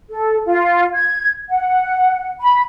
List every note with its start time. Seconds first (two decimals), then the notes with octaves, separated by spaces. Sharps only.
0.11 A4
0.46 F4
0.95 G#6
1.49 F#5
2.40 B5